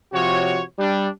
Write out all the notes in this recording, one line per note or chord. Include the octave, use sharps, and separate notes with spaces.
C3 F3 F#4 C#5
G3 D4